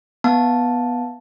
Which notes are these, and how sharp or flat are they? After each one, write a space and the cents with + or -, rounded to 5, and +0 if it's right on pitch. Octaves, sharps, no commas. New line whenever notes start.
B3 -10 F5 +40 A5 +0